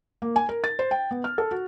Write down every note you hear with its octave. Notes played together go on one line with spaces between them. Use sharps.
A#3
G#5
A#4
A6
C5
G5
B3
F6
A4
F#4